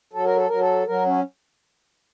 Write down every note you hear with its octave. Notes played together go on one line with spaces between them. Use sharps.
F#3 A4
A#4
A4
F#3 A#4
A4
F#3 A#4
C#4